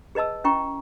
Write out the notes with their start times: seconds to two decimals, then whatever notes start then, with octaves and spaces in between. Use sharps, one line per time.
0.15 G#4 B4 D#5 A5 E6
0.44 C#4 E4 G5 A#5 C#6